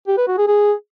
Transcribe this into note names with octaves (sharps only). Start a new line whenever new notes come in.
G4
B4
F#4
G#4
G#4